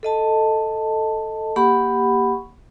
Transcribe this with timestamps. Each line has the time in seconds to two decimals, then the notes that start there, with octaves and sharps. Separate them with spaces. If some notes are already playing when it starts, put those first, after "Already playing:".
0.03 A4 D#5 A5
1.56 A#3 G4 F#5 B5 C#6